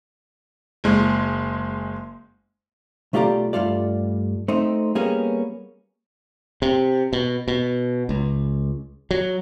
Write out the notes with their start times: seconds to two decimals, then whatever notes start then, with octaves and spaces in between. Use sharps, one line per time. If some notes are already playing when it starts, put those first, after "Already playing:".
0.84 F#1 G#3
3.13 B1 A3 F4 G4 D5 A#5
3.53 G2 G3 A3 F4 D5
4.48 A3 C4 D#4
4.95 G3 A#3 B3 C#4 G#4
6.62 C3
7.13 B2
7.48 B2
8.09 C#2
9.11 F#3